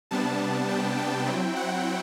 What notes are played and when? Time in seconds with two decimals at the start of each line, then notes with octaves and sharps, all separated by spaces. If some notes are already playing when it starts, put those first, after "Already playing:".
0.11 C3 G3 B3 D4 A5
0.68 G5
0.98 G5
1.27 F#3 C4 E4
1.56 F#5